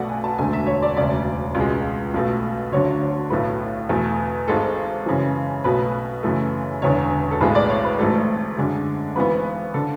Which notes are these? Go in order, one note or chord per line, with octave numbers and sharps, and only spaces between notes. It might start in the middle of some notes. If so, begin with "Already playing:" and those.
Already playing: B1 B2 A3 D5 F#5
G#5
A5
E1 D2 D3 A3 G#5
E5
C#5
D5
E1 D2 C#3 D5
C#2 B2 G#3
B1 B2 A3
D2 D3 F#3 C#5
C#5
B1 A2 F#3 A3 B4
E2 B2 A3
G#1 G#2 G#3 A4
F#2 C#3 E3
B1 B2 F#3 A3 B4
F#2 C#3 E3 A3
E1 E2 D3 C#5
A4
B1 A2 G#3 B3 B4
D5
C#5
B4
A1 G#2 F#3 A3 A4
F#2 D3 G#3
G#1 G#2 E3 B3 B4
D3 A4